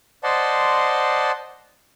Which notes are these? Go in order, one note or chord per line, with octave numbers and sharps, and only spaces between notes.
C5 D5 D#5 F#5 A5 C6